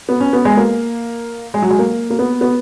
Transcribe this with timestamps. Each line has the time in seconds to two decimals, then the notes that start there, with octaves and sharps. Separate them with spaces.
0.09 B3
0.20 C#4
0.33 B3
0.45 G#3
0.57 A#3
1.54 G#3
1.62 F#3
1.70 G#3
1.79 A#3
2.10 A#3
2.19 B3
2.41 B3